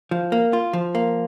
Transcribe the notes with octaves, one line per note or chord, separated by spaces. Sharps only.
F3
A#3
F4
F3
A#3